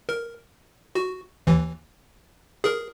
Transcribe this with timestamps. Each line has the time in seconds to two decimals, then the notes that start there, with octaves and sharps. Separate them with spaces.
0.09 A#4
0.95 F#4
1.47 D#2 E3
2.64 G#4 A#4